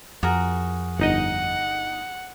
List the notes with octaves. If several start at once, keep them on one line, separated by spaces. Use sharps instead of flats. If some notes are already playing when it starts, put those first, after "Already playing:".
F2 F#4 G#4 A#4
G1 D#4 D#5 F#5